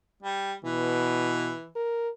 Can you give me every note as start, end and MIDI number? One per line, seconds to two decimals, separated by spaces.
0.23 0.53 55
0.64 1.54 47
0.64 1.69 52
1.76 2.10 70